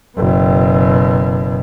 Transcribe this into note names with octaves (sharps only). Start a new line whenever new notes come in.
F#1 B2